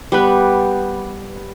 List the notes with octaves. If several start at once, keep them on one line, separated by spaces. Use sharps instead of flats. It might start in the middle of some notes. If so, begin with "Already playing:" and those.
G3 B3 B4